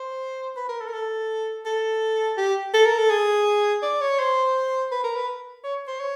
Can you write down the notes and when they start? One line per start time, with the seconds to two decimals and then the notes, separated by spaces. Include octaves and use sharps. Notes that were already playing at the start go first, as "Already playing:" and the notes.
Already playing: C5
0.57 B4
0.69 A#4
0.81 A4
0.88 A#4
0.93 A4
1.66 A4
2.38 G4
2.74 A4
2.86 A#4
2.98 A4
3.10 G#4
3.82 D5
4.01 C#5
4.19 C5
4.92 B4
5.04 A#4
5.16 B4
5.64 C#5
5.88 C5
6.00 C#5